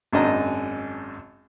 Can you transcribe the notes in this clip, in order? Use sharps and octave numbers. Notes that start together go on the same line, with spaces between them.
G#1 F#2 D4 D#5 A#5